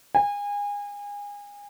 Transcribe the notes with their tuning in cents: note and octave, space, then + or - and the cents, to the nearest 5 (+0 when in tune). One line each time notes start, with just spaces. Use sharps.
G#5 -30